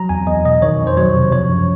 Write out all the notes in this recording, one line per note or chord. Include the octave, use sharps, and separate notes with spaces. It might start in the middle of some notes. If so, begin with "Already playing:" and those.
Already playing: F#3 A#5
E2 G#5
E2 D#5
B2 D#5
D#3 C#5
F2
C5
F#3 C#5
C3
F3 C#5
F#2